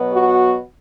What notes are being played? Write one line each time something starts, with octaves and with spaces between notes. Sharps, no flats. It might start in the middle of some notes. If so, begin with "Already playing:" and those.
Already playing: B2 F#3 B3
F#4